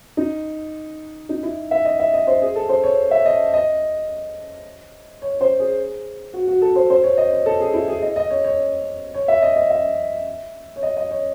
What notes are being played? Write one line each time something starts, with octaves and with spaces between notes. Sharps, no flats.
D#4
D#4
E4
E5
D#5
E5
D#5
C5
G#4
A4
C5
C#5
E5
D#5
D#5
C#5
C5
G#4
F#4
F#4
A4
C5
C5
C#5
D#5
C#5
A4
G#4
E4
G#4
D#5
D#5
C#5
C#5
C#5
E5
D#5
D#5
E5
C#5
D#5
D#5
C#5